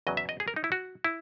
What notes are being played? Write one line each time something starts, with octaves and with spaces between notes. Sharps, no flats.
E2 C#3 F#3 D#5
E5
D#5
G#4
A#4
D#4
E4
F#4
E4